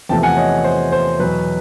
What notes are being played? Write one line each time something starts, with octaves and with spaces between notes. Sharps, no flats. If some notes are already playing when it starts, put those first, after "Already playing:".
E2 C3 F3 A3 G5 A5
F#5 G#5
C#5 D#5
C5
C5
E2 B2 F#3 B4